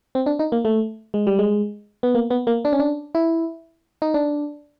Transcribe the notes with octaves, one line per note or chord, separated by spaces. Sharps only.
C4
D4
D#4
A#3
A3
G#3
G3
G#3
B3
A#3
B3
A#3
D4
C#4
D4
E4
D#4
D4